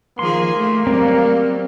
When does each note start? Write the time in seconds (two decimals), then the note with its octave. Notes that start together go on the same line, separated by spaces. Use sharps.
0.19 D#3 F3 A#3 G#4 C6
0.57 A3
0.87 F#3 G3 C4 A#4